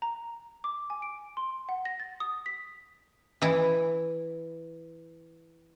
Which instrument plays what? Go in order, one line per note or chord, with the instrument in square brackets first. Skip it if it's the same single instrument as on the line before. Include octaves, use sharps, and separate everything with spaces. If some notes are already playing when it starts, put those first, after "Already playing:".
[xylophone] A#5
D6
G#5
D7
C6
F#5
A#6
A6
D#6
B6
[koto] E3 E4